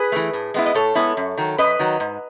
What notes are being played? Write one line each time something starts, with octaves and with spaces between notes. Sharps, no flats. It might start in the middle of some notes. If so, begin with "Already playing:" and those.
Already playing: G#4 B4
E3 A3
A2
G#3 B3 E4
D#5
A2 A4 C#5
G#3 B3 E4
F#2
D#3 F#3
F#2 B4 D#5
D#3 F#3
G#2